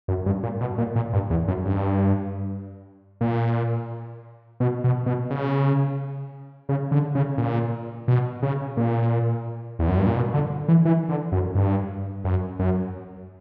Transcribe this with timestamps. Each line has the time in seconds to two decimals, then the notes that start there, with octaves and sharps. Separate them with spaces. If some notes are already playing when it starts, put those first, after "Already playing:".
0.08 F#2
0.26 G2
0.43 A#2
0.60 B2
0.78 A#2
0.96 A#2
1.13 G2
1.30 E2
1.48 F#2
1.66 G2
3.21 A#2
4.60 B2
4.84 B2
5.06 B2
5.30 C#3
6.69 C#3
6.91 D3
7.15 C#3
7.38 A#2
8.08 B2
8.42 C#3
8.77 A#2
9.79 E2
9.89 F#2
9.98 G2
10.07 A#2
10.16 B2
10.34 D3
10.68 E3
10.85 E3
11.09 D3
11.32 F#2
11.55 G2
12.24 F#2
12.59 F#2